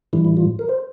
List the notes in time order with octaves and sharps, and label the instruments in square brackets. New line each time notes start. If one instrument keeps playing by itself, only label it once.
[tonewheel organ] A2 E3 G3 E4
E4
F4
A#4
C5